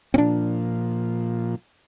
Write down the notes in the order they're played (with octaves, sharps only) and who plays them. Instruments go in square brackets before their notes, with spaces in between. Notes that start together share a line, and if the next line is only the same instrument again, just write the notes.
[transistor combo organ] A#2 F3 [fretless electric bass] C4 D4